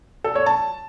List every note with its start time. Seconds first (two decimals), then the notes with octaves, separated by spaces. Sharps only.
0.24 A4
0.35 C#5
0.46 A5